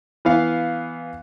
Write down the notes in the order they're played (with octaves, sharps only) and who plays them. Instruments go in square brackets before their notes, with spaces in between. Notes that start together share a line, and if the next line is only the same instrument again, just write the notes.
[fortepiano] E3 B3 F5